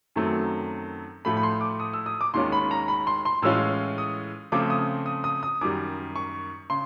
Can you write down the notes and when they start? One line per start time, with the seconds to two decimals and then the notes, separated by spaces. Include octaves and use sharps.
0.16 F#2 D#3 F#3 A3 C4
1.25 A2 F3 A3 B5
1.37 B5
1.43 C6
1.61 D6
1.80 D#6
1.93 E6
2.06 D#6
2.21 D6
2.34 D#2 D#3 G#3 C#4 F4 C6
2.52 B5
2.71 A#5
2.88 B5
3.07 C6
3.25 C6
3.42 A2 E3 G#3 C#4 F4 E6
3.98 D#6
4.52 C#3 F3 A3 C4 D6
4.70 D#6
5.06 D#6
5.24 D#6
5.43 D#6
5.61 F#2 D#3 G3 D6
6.16 C#6
6.70 C#3 C6